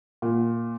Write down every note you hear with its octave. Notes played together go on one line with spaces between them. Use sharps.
A#2